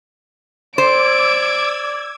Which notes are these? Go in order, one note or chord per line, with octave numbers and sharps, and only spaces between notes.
C5 D5 D6 E6 G#6 D7